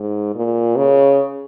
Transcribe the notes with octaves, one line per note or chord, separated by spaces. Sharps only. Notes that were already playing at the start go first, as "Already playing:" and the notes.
Already playing: G#2
A#2
C#3